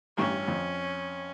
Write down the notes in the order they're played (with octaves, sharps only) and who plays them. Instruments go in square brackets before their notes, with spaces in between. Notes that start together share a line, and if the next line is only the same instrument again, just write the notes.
[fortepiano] A1 G2 C#6 [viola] C#4
[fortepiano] F2